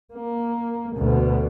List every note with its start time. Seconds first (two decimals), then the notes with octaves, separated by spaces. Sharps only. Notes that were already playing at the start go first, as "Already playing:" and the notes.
0.14 A#3
0.96 D2 B2